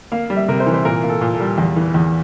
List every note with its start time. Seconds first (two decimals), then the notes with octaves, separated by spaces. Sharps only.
0.12 A#3 F5
0.30 G3
0.36 E5
0.48 C3 A#4
0.60 C5
0.66 E3
0.74 C5
0.85 A#2 A#4
1.03 A#3
1.09 A4
1.21 A#2
1.34 A4
1.40 G3
1.58 E2
1.76 E3
1.94 E2